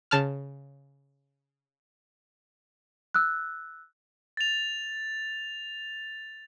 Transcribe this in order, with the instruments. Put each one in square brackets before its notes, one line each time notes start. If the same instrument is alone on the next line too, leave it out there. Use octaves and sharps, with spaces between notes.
[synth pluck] C#3 A5 F6
[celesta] E6 F#6
[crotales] A6 F7